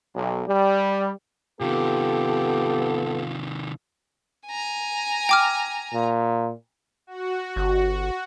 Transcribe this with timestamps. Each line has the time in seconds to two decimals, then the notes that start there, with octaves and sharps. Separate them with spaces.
0.15 B1
0.47 G3
1.61 C3 D#3 B3 F4 G4 A4
4.48 G#5 A#5
5.29 G5 D6 F6
5.94 A#2
7.07 F#4
7.56 G1